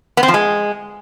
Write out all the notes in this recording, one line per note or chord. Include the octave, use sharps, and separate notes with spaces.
B3
C4
F3
G#3